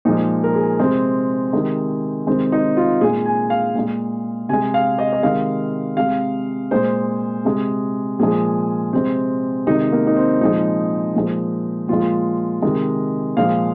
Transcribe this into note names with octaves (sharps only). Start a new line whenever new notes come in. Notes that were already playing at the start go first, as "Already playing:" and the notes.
A#2 F3 G#3 D#4
A#4
G#4
C3 G#3 C4
C3 D#3 G#3
C3 D#3 G#3 C4
D#4
F4
A#2 G#3 G#4
G#5
F5
A#2 G#3
C3 G#3 G#5
F5
D#5
D#5
C3 D#3 G#3 F5
C3 G#3 F5
A#2 G#3 C5
C3 G#3
A#2 F3 G#3 G#4
C3 G#3 C4
C3 D#3 G#3 D#4
A#3
D#4
C4
A#2 F3 G#3 D#4
A#2 F3 G#3
A#2 F3 G#3 F4
C3 D#3 G#3
A#2 F3 G#3 F5